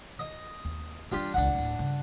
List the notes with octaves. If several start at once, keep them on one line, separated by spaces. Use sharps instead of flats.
D#5
D#2
E3 G3 D4 F4 G4
D1 C2 D4 F#5
D1 A2
G2 C#3